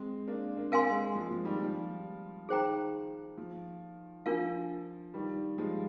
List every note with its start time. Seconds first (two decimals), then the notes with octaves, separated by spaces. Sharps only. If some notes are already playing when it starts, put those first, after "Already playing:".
Already playing: G#3 C4
0.27 A#3 D4
0.57 A#3 D4
0.72 C4 A#4 F5 G#5 C6
0.80 A#3
0.90 G#3 C4
1.15 F3 G#3
1.31 F3
1.45 D#3 G3
1.60 F3
2.49 D#3 G#4 C5 G5 A#5
3.38 F3
4.26 F3 D4 F4 A#4 F5
5.14 D#3 G3
5.58 F3 G#3